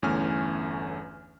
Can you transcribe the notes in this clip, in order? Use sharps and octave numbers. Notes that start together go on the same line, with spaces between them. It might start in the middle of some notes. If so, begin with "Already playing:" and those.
G1 E2 A3 C#4 G#5 F6